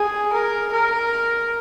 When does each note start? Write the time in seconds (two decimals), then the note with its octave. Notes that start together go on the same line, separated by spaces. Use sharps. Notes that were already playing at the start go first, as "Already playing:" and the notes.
Already playing: G#4
0.33 A#4
0.73 A#4